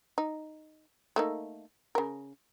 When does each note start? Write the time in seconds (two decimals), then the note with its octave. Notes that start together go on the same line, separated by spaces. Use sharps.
0.18 D#4
1.16 A3 A#3 D#4
1.95 C#3 A#4